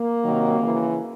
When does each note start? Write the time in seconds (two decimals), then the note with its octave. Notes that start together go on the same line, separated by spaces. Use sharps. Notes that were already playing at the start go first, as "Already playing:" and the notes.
Already playing: A#3
0.22 C3 D#3 F#3
0.59 C#3 E3